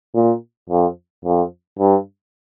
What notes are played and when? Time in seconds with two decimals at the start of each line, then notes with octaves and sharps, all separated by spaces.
0.15 A#2
0.69 F2
1.25 F2
1.79 G2